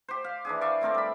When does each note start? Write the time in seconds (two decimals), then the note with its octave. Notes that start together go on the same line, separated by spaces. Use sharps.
0.08 G4 C5
0.24 F5
0.45 E3 D4 G#4
0.61 D5 E5 F5 C#6
0.81 A3 C4 A#4 D5
0.94 G3 B5